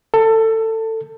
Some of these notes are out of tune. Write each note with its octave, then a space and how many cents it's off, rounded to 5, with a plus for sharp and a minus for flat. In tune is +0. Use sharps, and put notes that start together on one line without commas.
A4 +20